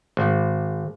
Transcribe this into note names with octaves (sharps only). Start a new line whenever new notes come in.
G#1